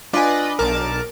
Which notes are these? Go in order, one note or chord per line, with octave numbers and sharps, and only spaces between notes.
D4 F4 B4 D5 D#5 G#5
B1 A#4 A5 D6